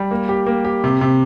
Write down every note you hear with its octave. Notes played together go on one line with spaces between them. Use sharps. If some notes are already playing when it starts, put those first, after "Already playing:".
Already playing: G3
A#3
G4
A#3
G4
C3
C3